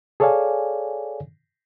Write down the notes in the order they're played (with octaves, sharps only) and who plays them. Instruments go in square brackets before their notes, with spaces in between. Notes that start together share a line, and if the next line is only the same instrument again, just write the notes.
[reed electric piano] G#4 A4 C#5 D5 F5 G#5